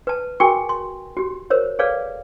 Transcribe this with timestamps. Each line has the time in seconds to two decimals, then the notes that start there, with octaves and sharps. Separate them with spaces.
0.07 B4 A5
0.40 F#4 G#4 A#4 G5 G#5 C#6
0.69 C6
1.17 F#4 G4
1.50 A#4 C5 C#5
1.79 G#4 A4 B4 C#5 D5 F5